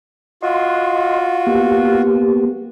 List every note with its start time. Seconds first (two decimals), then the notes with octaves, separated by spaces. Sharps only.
0.42 F4 F#4 D#5 C6
1.47 A#3 B3 G4